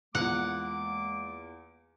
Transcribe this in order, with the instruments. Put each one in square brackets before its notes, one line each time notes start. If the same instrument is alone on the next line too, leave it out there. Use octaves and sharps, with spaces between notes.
[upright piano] E2 F4 [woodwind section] G#3 A#3 D6 [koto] F#5